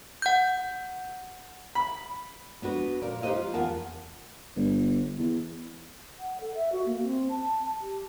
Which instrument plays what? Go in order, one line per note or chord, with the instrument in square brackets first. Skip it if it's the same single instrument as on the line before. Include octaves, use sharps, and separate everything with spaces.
[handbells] F#5 G6
[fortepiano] B5
[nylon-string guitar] B3 D4 F#4 B4
A#2 A#4 D5
D#4 G4 B4 C5 D#5 F5
F4
E2 B3 A#4 F5 A5
[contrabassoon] G1
E2
[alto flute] F#5
A4
E5
F#4
A#3
C4
A5
G4